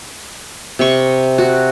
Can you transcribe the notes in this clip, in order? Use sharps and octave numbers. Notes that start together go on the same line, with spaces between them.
C3 C#6
F#4